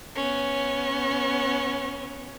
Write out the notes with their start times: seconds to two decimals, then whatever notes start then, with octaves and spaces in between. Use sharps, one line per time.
0.16 B3 C#4